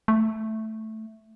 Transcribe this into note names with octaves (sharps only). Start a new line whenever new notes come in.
A3